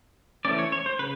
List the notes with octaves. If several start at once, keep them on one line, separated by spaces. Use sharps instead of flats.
E3 A3 C#4 D5
C#5
C#5
C5
C#3 B4